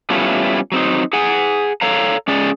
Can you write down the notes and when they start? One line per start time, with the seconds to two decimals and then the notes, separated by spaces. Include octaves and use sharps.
0.10 G3 A3 B3 C#4 E4 F4
0.72 F#3 C4 D#4
1.13 G#4 F#5 G#5
1.81 A4 C#5 F5 A#5
2.28 G#3 C#4 G#4 D5